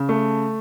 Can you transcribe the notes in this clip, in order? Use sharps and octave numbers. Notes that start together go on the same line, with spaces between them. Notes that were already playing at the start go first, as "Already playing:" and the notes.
Already playing: C#3
A3